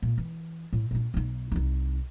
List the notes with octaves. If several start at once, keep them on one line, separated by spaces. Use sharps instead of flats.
A#2
E3
A2
A#2 D4
B1 D#4
C2 D#4